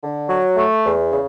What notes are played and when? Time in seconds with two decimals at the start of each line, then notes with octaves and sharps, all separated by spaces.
0.03 D3
0.29 F#3
0.56 A3
0.84 E2
1.11 C#3